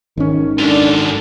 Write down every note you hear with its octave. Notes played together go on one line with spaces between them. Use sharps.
G#1 D#3 C#4
F#2 D4 F4 A4